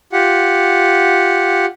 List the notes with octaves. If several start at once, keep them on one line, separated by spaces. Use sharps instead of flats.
F4 G4 F#5